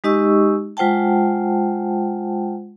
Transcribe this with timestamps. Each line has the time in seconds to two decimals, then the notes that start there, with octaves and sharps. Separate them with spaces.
0.04 G#3 D#4 G4 D#5 C#6 E6
0.77 G#3 F4 C5 F#5 G5 A5